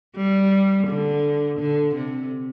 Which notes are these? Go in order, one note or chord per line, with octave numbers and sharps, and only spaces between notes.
G3
D3
D3
C3